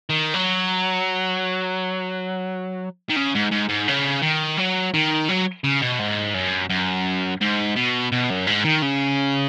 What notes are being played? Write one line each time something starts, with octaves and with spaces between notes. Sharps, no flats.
D#3
F#3
D#3
C#3
G#2
G#2
G#2
C#3
D#3
F#3
D#3
F#3
C#3
B2
G#2
F#2
F#2
G#2
B2
B2
F#2
G#2
D#3
C#3